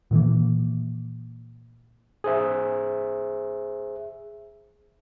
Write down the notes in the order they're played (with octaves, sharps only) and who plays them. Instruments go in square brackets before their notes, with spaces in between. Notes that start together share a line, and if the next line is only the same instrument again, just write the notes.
[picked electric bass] A#2 D#3 E3 A#3
[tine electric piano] G#4 C5 E5